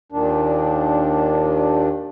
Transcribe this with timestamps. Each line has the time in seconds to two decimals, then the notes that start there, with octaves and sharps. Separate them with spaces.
0.12 D#2 A#2 D#3 D4